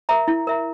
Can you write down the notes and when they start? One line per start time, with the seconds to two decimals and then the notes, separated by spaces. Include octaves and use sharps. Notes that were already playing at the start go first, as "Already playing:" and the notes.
0.09 A#4 E5 A#5
0.28 E4
0.47 A#4 E5 A#5